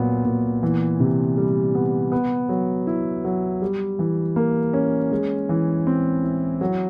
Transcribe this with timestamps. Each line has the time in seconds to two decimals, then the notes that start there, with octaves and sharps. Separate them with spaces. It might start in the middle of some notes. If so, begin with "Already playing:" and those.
Already playing: A#2 F#3 B3
0.25 A#2
0.63 E3
1.00 C3
1.37 G3
1.75 B3
2.12 B3
2.49 F#3
2.87 E4
3.24 F#3
3.62 G3
3.99 E3
4.36 A#3
4.74 C#4
5.12 G#3
5.49 E3
5.87 C4
6.23 E4
6.61 F#3